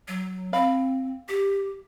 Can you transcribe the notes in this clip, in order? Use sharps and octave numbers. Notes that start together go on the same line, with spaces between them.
F#3
C4 F5 B5
G4